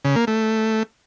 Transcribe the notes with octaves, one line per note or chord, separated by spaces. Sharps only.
C#3
A#3
A3